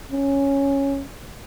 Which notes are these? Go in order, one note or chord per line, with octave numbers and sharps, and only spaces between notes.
C#4